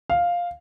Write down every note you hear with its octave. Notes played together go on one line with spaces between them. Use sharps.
F5